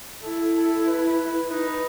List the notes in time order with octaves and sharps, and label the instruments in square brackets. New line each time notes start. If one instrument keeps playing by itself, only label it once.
[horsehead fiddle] E4 [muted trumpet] A4
[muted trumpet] A4
B4
[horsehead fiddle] D#4 [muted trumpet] B4